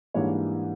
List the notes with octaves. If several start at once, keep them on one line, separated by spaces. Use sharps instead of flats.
G#2 E3 G3 A#3 D4 C#5